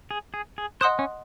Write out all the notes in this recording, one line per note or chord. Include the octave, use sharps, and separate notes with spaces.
G#4
G#4
G#4
C5 D#5 F#5 C6 D#6 F#6
C#4